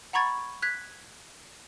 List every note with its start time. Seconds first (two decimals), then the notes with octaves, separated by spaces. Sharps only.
0.13 F#5 A#5 B5 C#6 G#6 A6
0.62 F#6 G#6 B6